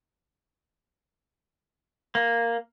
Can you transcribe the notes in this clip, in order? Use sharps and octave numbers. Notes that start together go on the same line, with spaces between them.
A#3